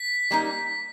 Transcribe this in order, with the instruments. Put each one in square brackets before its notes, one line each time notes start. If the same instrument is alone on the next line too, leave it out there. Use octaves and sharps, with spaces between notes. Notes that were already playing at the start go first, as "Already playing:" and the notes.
Already playing: [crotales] B6
[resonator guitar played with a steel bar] G3 A#3 D#4